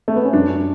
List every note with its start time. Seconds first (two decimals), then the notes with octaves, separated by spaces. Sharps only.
0.08 A3
0.16 B3
0.25 C#4
0.33 F#2 D4